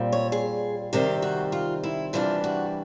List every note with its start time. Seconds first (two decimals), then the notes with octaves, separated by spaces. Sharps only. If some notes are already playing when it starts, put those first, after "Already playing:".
Already playing: A#2 G3 C4
0.13 C#5
0.32 G#4
0.93 C3 D#3 G3 C4 G4
1.22 F#4
1.52 F4
1.84 E4
2.13 C3 E3 G3 B3 D4 F4
2.44 F#4